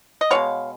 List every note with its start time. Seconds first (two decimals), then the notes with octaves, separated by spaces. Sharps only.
0.21 D#5
0.31 B2 G#3 B3 C#5 F5